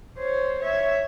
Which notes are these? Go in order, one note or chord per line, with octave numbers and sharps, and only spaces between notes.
C5 C#5
C#5 E5